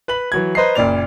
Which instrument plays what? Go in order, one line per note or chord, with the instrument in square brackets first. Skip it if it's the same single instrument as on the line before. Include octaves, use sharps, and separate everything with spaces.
[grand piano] B4 B5 F#7
E3 F#3 G#6
B4 C5 D#5 A#5 C7
F#1 A#2 D5 F7